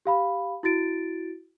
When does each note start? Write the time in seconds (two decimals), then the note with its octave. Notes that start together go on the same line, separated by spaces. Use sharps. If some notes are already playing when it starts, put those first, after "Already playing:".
0.06 G4 F5 B5
0.63 E4 F#4 A6 D7